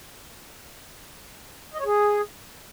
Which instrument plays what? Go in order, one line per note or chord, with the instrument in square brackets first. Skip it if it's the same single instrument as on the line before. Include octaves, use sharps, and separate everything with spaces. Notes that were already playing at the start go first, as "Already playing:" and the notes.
[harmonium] D#5
C#5
G#4